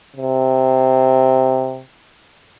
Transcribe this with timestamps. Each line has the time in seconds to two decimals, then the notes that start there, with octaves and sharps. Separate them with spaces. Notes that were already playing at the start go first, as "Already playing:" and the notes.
0.17 C3